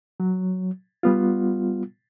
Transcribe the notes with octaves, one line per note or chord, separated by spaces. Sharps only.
F#3
G3 B3 F4